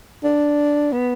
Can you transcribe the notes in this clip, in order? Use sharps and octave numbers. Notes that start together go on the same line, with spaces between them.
D4
B3